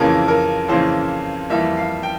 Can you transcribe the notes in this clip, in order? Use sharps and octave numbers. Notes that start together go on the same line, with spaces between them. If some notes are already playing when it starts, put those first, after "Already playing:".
Already playing: F2 C#3 E3 A#3 C#4 A#4
A#4
F2 C#3 E3 A#3 C#4 C5
F2 E3 G3 A#3 E5
F5
G5